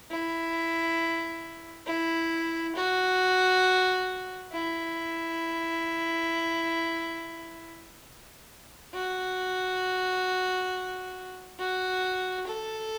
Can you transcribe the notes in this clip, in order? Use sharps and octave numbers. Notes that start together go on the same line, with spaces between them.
E4
E4
F#4
E4
F#4
F#4
A4